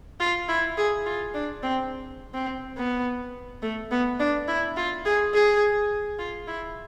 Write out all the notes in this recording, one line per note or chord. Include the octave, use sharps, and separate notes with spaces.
F4
E4
G#4
F4
D4
C4
C4
B3
A3
B3
D4
E4
F4
G#4
G#4
F4
E4